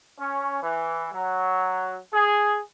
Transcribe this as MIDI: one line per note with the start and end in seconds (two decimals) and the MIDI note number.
0.18 0.57 61
0.60 1.07 52
1.11 1.96 54
2.12 2.58 68